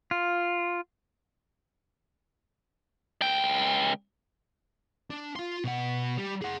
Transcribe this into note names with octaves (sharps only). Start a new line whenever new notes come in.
F4
C#2 G5
D4
F4 C6
B2 F#5
G3
G#4 F#5